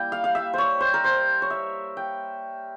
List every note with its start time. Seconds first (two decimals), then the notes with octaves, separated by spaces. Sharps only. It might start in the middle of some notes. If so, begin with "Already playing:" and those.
Already playing: G3 A#3 E4 G5
0.12 F5
0.24 F5
0.35 E5
0.54 C5 C#5
0.80 C5
0.94 A#4
1.04 C5
1.42 C#5
1.50 E5
1.97 G5